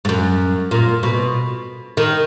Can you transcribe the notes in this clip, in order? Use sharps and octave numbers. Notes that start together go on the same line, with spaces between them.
G#2
F#2
A#2
B2
D#3